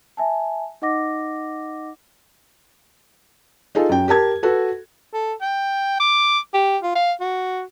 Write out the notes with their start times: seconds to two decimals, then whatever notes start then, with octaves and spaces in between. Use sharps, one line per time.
0.17 E5 G#5 A5
0.82 D#4 D#5 F#5 D6 A#6
3.75 D#4 F4 G#4 A4
3.89 F#2 G5
4.08 G4 A#4 A5 G#6
4.43 F#4 A4 B4
5.13 A4
5.41 G5
6.00 D6
6.54 G4
6.83 F4
6.95 F5
7.20 F#4